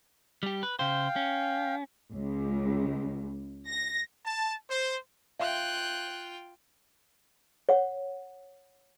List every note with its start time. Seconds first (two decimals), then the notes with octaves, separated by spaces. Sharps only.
0.43 G3 G4
0.63 B4
0.79 C#3 C5 F5 G5
1.16 C#4
2.13 C#2
3.67 A#6
4.25 A5
4.70 C5
5.40 F4 E5 F5 G5 C6 F#6 G6
7.69 C#5 F#5